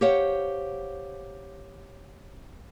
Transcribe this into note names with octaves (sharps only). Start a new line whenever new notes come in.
G4 C5 C#5 F5 F#5